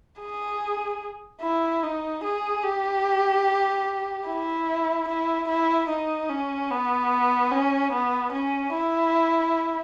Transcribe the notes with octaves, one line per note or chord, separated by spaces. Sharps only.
G#4
E4
D#4
G#4
G4
E4
E4
E4
D#4
C#4
B3
C#4
B3
C#4
E4